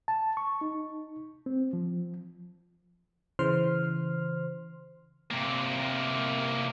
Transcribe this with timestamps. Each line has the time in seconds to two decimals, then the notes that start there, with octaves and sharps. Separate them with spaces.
0.08 A5
0.37 C#6
0.61 D#4
1.46 C4
1.73 F3
3.39 C#3 E3 C5 C6 F6
5.31 C3 A#3